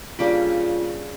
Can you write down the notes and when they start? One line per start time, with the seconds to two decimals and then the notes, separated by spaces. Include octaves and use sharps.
0.19 C#3 G3 A#3 D4 F4